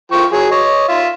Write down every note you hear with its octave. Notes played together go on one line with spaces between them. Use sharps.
F3 G5 C#6
F#3 G#4
C#5 D#5
F4 E5